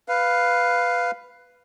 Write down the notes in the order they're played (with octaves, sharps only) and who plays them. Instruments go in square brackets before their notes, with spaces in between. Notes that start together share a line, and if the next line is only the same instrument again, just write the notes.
[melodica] B4 F5